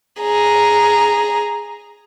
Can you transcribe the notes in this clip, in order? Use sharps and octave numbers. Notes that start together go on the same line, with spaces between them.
G#4 A#5